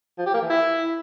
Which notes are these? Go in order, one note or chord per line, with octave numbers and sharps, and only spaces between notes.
F3
G4
A#3
E3
E4